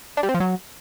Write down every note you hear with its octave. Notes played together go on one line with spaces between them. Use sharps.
D4
G3
C4
F3
F#3